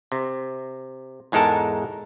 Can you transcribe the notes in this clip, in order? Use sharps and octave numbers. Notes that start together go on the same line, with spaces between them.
C3
E2 G#2 G#3 A4 A#4 A5